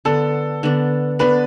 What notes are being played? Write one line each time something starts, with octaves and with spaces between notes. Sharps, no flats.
D3 B3 D4 A4
D3 B3 D4
D3 B3 D4 B4